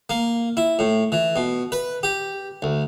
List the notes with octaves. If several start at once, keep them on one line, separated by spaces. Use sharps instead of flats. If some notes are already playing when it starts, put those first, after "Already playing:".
A#3
E4
A2
E3
B2
B4
G4
D2